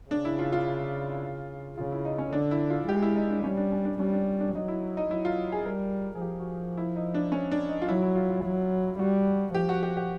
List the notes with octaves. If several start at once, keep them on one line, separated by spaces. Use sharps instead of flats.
C#3 D4
E4
F4
F4
C#3 F4
E4
D#4
C#4
D3 D4
E4
F4
G#3 G4
E4
D#4
D4
G3 C#4
D4
C#4
D4
G3 C#4
D4
D4
F#3 D#4
E4
D#4
F#3 E4
F4
G#4
G3 A#4
G#4
F3 G4
F#4
E4
D#4
D4
C#4
D4
D#4
F4
F#3 E4
E4
F4
F4
F#3
G3 F#4
F3 G4
F#4
G4
G4